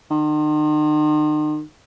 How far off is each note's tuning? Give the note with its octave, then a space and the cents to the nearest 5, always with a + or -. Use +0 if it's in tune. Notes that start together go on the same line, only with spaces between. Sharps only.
D#3 -40